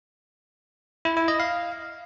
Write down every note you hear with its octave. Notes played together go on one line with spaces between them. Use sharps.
E4
E4
D#5
F5